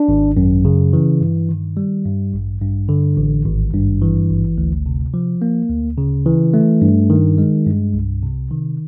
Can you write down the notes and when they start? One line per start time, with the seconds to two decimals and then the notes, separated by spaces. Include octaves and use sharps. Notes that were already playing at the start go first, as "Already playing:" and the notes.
Already playing: D4
0.09 G#1
0.37 F#2
0.65 C#3
0.93 E3
1.21 G2
1.49 D#3
1.77 G3
2.05 G2
2.33 A1
2.61 G2
2.89 D3
3.17 A1
3.45 G#1
3.74 G2
4.02 E3
4.30 G#1
4.58 D2
4.86 C3
5.14 F3
5.42 A#3
5.69 D2
5.98 C#3
6.26 E3
6.54 A3
6.82 G2
7.10 D#3
7.38 G#3
7.66 G2
7.94 C2
8.23 C3
8.51 D#3